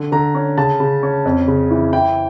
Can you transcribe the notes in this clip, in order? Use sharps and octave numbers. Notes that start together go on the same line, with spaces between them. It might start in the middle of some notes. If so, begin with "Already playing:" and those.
Already playing: D3
D3 A#5
C#4
C#3 A5
C#3
C#4
F2
C#3
E3
E4 G5